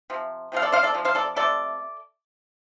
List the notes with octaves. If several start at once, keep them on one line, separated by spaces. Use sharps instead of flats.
C3 F3
C3 F3 A3 F5
A4 D5
C5 F5
A4 D5
C3 F3
C5 F5
A4 D5
C3 F3 A3 A4 D5